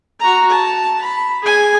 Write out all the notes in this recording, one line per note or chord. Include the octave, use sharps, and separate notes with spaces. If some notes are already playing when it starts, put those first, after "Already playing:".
F#4 A#5
A5
B5
G#4 G#5